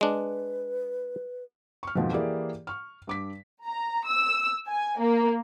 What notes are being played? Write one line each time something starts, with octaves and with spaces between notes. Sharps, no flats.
G#3 D4 B4
C#6 F6
F2 G#2 B2 F3
E3 A#3 E4 G4 G#4 D5
C#6 F6
G2 D6 B6
A#5
E6
G#5
A#3